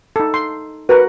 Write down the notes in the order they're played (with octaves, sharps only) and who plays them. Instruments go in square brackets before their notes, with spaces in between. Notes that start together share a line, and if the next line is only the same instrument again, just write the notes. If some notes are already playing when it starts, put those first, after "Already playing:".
[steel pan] D#4 A4
C6
[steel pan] F#4 A#4 F#5 [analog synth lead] B4